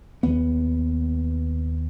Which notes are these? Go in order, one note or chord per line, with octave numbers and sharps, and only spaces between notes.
D#2 B3